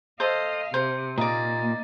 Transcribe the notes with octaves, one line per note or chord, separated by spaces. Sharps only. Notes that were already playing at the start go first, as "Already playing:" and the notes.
A4 C5 D#5 F5
C3 C5
A#2 A#3 D#4 D5